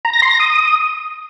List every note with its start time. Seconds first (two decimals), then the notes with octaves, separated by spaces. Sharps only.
0.05 A#5
0.13 A#6
0.22 C6
0.31 A#6
0.39 D#6